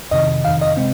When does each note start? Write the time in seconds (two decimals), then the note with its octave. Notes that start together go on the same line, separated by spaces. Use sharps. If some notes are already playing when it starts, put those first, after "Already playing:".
0.11 F2 C3 D#3 D#5
0.45 F2 C3 D#3 F5
0.61 D#5
0.77 C3 G#3 C4